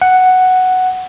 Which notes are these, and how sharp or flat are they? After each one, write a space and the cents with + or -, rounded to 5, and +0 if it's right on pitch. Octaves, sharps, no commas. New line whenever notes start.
F#5 +0